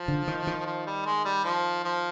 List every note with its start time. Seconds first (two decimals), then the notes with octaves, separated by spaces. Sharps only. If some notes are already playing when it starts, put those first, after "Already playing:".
Already playing: F3
0.08 D3
0.28 D#3
0.47 D#3
0.66 F3
0.87 G3
1.06 G#3
1.25 G3
1.44 F3
1.84 F3